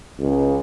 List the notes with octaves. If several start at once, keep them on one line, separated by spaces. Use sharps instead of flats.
C#2